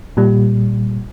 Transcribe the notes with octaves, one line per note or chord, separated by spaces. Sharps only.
A#2 G3